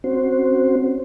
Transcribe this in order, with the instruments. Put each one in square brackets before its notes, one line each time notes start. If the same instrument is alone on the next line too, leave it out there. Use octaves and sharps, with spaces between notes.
[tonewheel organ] C4 C#4 F#4 C5